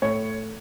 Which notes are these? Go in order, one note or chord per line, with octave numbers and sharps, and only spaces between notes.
A2 C#5